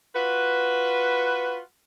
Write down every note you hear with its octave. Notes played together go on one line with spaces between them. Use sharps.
F4 F#4 B4